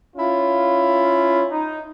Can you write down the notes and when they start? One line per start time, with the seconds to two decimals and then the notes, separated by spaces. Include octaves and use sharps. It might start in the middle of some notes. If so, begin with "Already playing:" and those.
0.16 C#4 E4 F4
1.51 D#4